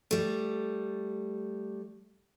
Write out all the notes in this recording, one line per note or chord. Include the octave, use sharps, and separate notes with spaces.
G3 A3